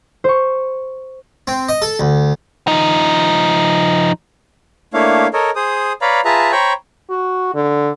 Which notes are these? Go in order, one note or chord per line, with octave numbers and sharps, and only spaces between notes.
C5 C#6
C4
D#5
A4
D2
F3 D#4
A3 A#3 D4 E4 C#5 F5
A4 A#4 C#5 D#5
G#4 C5 D#6
B4 C#5 D5 F5 A#5 B5
F4 G#4 B4 E5 A5 A#5
C5 C#5 G5 A#5 B5 C#6
F#4
D3